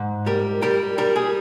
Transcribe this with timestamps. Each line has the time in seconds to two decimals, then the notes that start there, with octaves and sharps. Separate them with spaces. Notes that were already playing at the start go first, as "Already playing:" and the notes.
Already playing: G#2
0.26 G3 A#4
0.62 G3 A#4
0.98 G3 A#4
1.16 G#4